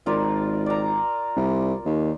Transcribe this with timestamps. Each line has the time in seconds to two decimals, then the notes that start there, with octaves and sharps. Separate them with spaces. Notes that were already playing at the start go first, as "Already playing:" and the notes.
0.06 G#1 F4 A#4 D5
0.66 D5 A#5
1.36 C2
1.85 D#2